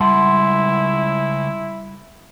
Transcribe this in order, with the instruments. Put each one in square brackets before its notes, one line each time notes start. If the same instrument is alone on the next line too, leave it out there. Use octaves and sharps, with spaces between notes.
[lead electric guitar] C#2 F#5 [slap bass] G3 [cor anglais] E4 [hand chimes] A5 C6